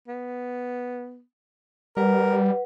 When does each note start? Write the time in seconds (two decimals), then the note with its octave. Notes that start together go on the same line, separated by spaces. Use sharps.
0.08 B3
1.97 G3 A#4 B4 F#5